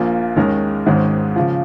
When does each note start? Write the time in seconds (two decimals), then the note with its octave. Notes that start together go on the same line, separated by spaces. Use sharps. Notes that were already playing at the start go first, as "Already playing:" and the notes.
Already playing: A#1 A#2 A#3 F4
0.36 D#2 D#3 G#3 C#4 A#4
0.86 G#1 G#2 D#3 G#3 C#4
1.36 C#3 F3